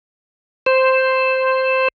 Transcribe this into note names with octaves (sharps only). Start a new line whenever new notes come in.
C5